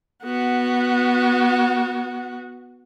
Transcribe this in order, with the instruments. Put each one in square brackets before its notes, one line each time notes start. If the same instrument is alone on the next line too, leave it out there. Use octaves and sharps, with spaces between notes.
[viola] B3 F#4